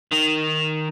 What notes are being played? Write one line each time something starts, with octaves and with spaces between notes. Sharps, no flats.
D#3